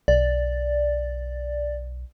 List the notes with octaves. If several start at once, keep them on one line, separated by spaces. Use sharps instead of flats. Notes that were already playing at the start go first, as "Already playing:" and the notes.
B1 D5